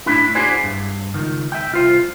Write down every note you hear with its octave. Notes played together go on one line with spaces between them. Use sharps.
A2 D4 E4
D4 E4 F#4 G#4 C5 D5
G2
C#2 D#3
E5 G5
C2 F4 C5